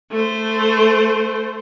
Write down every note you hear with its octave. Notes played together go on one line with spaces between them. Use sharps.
A3 C5